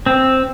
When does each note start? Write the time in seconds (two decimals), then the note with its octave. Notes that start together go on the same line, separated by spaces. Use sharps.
0.06 C4